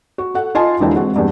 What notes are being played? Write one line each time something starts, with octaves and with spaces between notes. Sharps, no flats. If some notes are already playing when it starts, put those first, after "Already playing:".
F#4
A4 F#5
F4 D#5 G#5 A5 C6
E1 D3 E3 G5 A5
G#3 C4 F#4 F#5
E2 G2